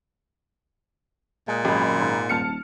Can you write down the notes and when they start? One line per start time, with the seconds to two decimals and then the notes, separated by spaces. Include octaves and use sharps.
1.48 A#2 G#3
1.65 G#1 F#2 G#3 G4 B5
2.01 G#2
2.29 D#1 A5 F6 C#7